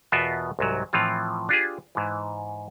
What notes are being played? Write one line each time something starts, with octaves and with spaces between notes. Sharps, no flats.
E2 B2 B3 F4 A#4 E5
C2 G#2 F#3
A2 E3 F3 C4 F4
D4 F4 G4 G#4
G#2 E3